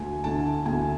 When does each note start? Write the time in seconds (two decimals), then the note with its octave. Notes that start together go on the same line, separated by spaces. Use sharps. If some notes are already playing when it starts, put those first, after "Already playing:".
Already playing: D2 G#5
0.24 D3 A3 A5
0.66 D2 G#5